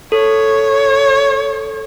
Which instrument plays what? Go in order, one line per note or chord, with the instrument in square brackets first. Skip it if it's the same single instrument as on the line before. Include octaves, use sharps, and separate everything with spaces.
[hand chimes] A4 [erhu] C#5